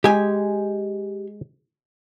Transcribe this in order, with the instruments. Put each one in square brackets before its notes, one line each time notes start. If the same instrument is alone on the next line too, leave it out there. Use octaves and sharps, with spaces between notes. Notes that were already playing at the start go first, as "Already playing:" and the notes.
[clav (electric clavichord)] G#3 [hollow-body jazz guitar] G4 G#5